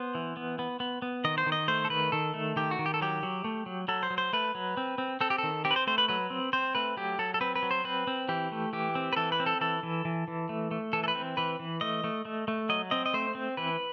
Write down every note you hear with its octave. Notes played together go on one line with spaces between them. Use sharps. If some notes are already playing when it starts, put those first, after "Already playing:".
Already playing: B3 C5
E3
B3
B3
B3
B3
D#3 D#5
C5
D#3
D#5
A3 C5
A4
D#3 B4
D#3 A4
A3
D#3 G4
F#4
D#3
G4
A4
F#3 G4
F#3
A3
F#3
F#3 A4
C5
F#3
C5
A3 B4
F#3
C4
C4
C4 A4
G4
D#3 A4
C4 G4
B4
C5
A3 C5
B4
F#3 B4
C4
C4 C5
A3 B4
F#3 G4
F#3 A4
A4
C4 B4
B4
F#3
C5
C4 B4
C4
E3 G4
A3
E3 G4
C4
B4
E3 A4
B4
C4
A4
E3 A4
E3
E3
E3
A3
A3
E3 A4
A4
B4
C4
E3 B4
E3
A3 D#5
A3
A3
A3
F#3 D#5
C4 D#5
D#5
A3 C5
C4
E3 B4